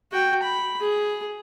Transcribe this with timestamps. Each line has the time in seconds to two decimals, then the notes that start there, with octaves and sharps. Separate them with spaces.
0.12 F#4 G5
0.43 B5
0.81 G#4